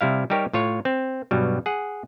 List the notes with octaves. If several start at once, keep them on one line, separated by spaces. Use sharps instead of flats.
C3 G3 E4 F5
G3 D#4 G4 A#4 C#5
A2 F4 C#5
C4
G2 B2 F#3 G3
G#4 F#5